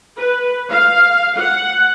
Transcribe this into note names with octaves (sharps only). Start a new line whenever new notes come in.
B4
F5
F#5